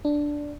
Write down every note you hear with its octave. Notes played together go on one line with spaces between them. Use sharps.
D4